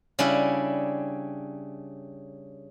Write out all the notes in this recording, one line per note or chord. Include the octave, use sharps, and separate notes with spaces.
C#3 G3 C#4 D4 E4